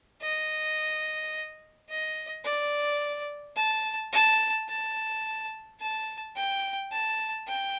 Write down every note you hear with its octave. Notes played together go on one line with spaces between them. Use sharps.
D#5
D#5
D5
A5
A5
A5
A5
G5
A5
G5